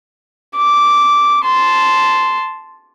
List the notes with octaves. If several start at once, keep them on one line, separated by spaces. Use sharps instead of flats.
D6
A5 C6